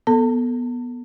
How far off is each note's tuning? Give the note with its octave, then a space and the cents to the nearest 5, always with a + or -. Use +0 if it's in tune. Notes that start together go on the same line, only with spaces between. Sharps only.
B3 -15 A4 +5 A5 +40